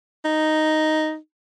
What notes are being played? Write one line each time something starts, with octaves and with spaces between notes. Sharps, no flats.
D#4